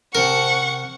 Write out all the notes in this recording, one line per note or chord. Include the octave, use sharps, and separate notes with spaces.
C3 A#4 F#5 A5 C#6